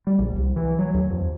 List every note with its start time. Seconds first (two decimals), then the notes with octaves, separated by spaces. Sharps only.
0.07 G3
0.19 A#1
0.36 C2
0.56 E3
0.79 F#3
0.94 D#2
1.10 F2